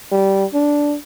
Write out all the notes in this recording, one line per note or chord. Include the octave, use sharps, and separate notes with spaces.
G3
D4